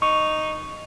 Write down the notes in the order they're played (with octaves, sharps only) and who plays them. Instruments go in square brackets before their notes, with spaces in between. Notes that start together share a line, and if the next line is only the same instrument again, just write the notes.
[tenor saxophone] D#4 [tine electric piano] C#6